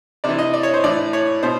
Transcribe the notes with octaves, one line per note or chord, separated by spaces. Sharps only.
C3 E3 D5
D#5
D5
C#5
C5
A2 E3 D5
C#5
B2 C5